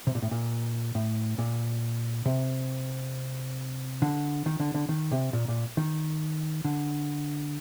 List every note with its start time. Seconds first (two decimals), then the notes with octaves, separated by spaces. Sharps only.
0.07 C3
0.15 A#2
0.22 A2
0.31 A#2
0.95 A2
1.38 A#2
2.26 C3
4.02 D3
4.46 D#3
4.60 D3
4.74 D3
4.89 D#3
5.11 C3
5.33 A#2
5.48 A#2
5.77 D#3
6.65 D3